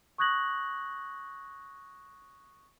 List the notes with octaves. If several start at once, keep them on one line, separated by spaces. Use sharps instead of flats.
C#6 D#6 F#6 G#6 A#6 F#7